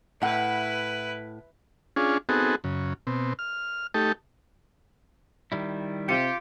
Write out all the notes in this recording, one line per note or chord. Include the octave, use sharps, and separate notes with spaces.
A2 E4 B4 F#5
C#4 D4 F4 G#4
B3 C4 D#4 F#4 G#4 A4
F#2 C#3
B2 C4
F6
A3 D#4 G4 A4
D#3 G3 E4
C3 F4 G4 C#7